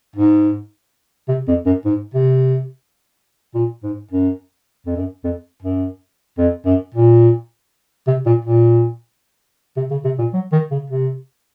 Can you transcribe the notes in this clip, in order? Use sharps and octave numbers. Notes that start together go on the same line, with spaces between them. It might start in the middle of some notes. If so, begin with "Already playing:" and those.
G#2
C3
F2
F#2
G#2
C3
A#2
G#2
F#2
F2
F#2
F2
F#2
F2
F#2
A#2
C3
A#2
A#2
C3
C#3
C3
A#2
F#3
D#3
C#3
C3